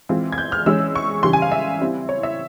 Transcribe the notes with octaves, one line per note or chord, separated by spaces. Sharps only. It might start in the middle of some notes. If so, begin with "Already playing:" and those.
E3 G#3 C4 F4
G#6
G6
F6
E3 G#3 C#4 E6
C#6
C#3 E3 G3 C6
G#5
F5
E5
G3 C4 E4
C#5
E5